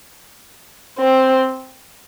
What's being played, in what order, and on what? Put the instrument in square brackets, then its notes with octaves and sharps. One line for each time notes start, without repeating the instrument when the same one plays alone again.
[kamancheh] C4